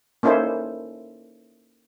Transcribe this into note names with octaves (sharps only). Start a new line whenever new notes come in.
A#3 C#4 D#4 E4 A4 C5